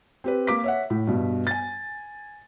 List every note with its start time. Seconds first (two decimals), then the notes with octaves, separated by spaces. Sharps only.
0.24 C4 G4 B4
0.47 A#3 D6 B6
0.64 C#5 E5 F#5
0.90 A2
1.07 G2 B2
1.47 G#5 A6